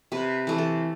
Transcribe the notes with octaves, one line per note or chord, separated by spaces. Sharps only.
C3 B4
E3 A3
A4